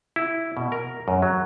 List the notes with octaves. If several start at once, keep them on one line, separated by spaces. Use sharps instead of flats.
E4
B2
A#4
F#2
F#3